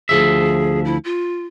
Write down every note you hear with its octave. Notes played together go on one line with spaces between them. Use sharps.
D2 F3 G#4 E5
E4
F4